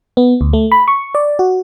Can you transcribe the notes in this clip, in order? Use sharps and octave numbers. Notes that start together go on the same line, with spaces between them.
B3
D2
A3
B5
C#6
D5
F#4